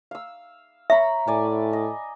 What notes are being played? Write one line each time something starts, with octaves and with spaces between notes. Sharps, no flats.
F5 E6
C#5 E5 A#5 B5
A2 D5 G#5
D#5